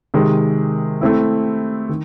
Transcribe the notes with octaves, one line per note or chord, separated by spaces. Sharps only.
C3 D#3 G#3
A3 C4 E4
D#3